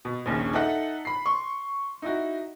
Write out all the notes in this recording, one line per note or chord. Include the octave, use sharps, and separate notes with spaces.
B2
A#1 D#2 C#3
D#4 A4 E5 F#5
B5 C7
C6 C#6
D#4 E4 F#4